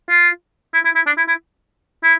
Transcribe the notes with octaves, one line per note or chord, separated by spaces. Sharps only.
F4
E4
E4
E4
D4
E4
E4
E4